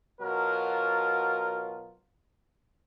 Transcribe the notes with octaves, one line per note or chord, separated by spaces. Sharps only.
B2 F#3 F4 A#4